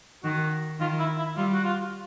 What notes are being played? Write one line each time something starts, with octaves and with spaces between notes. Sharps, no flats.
D#3 F#4
D#3 F4
E4
E4
G3 F4
F#4
F4